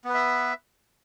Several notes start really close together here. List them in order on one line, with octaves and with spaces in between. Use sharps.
B3 B4 E5